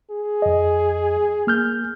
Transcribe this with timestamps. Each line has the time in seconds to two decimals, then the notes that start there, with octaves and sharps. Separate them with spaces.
0.10 G#4
0.42 F2 D#5
1.47 A#3 F6 G6